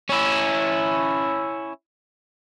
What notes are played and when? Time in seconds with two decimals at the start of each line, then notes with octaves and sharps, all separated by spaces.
0.10 C#4 E4